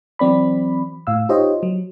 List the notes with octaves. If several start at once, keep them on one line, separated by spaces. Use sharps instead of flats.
E3 F#3 C4 D5 B5
A2 F5 E6
D#4 F4 G4 C5 C#5 D#5
F#3